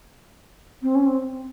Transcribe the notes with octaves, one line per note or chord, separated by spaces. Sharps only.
C4
C#4
C4